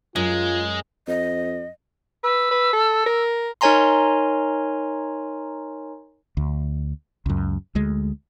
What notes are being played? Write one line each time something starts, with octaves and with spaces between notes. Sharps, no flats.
F#2 G#3 F4
F2 D#5
B4 E6
B4
A4
A#4
D#4 A#4 C#5 G#5 A#5 C6
D2
C#2 F#2
D2 G#3